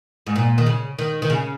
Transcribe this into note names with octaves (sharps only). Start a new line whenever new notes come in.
G#2
A#2
D#3
C#3
D#3
D#3
C#3